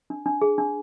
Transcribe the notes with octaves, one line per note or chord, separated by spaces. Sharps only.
D4
D4
G#4
D4